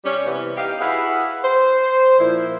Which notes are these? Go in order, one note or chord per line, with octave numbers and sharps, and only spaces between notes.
C3 G3 C#4
C3 E3 B3
D#4 G4 F5
E4 F#4 G#4 B4 F5 F#5
C5
A#2 F3 E4